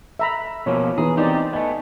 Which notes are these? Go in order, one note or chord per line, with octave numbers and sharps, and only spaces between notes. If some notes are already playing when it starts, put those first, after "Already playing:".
E5 A#5 B5
B2 F3 A#3 C#5 G#5
E3 B3 G#4 A#5
C4 D#4 G4 D5
A6
A3 B3 D#5 G#5